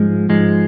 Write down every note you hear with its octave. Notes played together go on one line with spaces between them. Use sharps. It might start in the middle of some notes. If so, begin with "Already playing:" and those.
Already playing: G#2 F3 G#3
G#2 F3 G#3